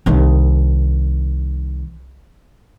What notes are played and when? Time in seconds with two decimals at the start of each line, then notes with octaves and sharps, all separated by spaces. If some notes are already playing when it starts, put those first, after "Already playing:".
0.06 C2 D#3